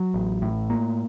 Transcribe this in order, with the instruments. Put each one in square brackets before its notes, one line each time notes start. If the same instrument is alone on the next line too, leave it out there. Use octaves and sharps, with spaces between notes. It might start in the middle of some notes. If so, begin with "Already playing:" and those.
Already playing: [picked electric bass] F#3
A1
A2
A#3